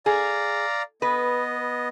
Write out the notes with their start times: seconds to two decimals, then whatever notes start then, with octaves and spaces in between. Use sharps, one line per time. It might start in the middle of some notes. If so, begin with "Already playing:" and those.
0.06 G#4 D5 F5 A#5
1.02 B3 B4 D#5